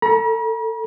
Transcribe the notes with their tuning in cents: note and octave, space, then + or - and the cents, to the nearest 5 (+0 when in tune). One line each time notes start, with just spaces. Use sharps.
A4 +25 A#5 +45